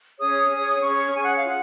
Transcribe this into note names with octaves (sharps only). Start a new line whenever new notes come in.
C#4 G#4 C#5 D#6
C#4 G#4 C#5
C#4 G#4 C#5 C#6
C#4 G#4 C#5 G#5
F#5
F5
F4 F#5